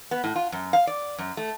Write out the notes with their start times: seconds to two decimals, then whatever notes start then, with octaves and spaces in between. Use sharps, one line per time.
0.11 B3
0.24 A2
0.36 F4
0.52 F#2
0.73 F5
0.87 D5
1.18 F#2
1.37 A3